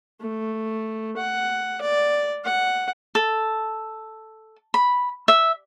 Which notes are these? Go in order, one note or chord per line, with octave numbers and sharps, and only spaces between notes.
A3
F#5
D5
F#5
A4
B5
E5